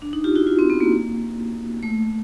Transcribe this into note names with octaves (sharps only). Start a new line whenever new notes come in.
D4
D#4
F4 G4
E4 F#4
F4
C4
B3
A#3
A3